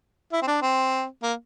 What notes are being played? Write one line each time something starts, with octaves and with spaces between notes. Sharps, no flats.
E4
C4
D4
C4
A#3